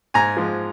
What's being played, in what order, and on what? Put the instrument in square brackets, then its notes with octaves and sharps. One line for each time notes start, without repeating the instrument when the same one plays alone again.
[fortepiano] G#2 G#5 A#5
F3 G#3